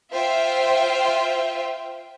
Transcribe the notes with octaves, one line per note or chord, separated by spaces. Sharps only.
F4 C5 E5 G5